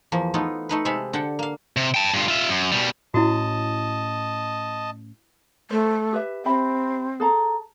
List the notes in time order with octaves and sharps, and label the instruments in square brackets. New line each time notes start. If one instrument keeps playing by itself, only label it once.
[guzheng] E2 F3 A#3
A3 B3 D#4 F4
A3 D#4 B4
C3 G#3 A4 E5 F5 B5
D3 F#5 G5 A5
A#3 F5
[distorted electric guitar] C3
G5 A5
G2 F4
F4 E5
F#2
B2 G3
[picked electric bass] A2 C#4 [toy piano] E4 F#4 [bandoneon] D#5 A5
[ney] A3 [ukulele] C5
[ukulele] G4 B4 E5
[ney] C4 [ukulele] G4 E5 B5
[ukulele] G#4 A4 A#5